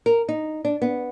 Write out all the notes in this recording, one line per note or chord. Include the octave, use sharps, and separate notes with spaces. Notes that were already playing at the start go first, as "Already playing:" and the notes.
A#4
D#4
D4
B3